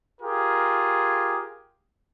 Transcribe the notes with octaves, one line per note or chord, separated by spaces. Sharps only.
F4 G4 G#4 A#4